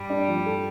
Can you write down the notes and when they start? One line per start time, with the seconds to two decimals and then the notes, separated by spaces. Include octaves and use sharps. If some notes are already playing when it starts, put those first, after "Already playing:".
Already playing: G2 G3
0.10 D4
0.28 F3
0.46 A4